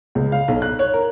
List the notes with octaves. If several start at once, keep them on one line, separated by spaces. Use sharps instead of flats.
C#2
F5
B1
F#6
C#5
A#4